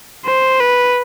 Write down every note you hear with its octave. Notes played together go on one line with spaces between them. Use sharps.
C5
B4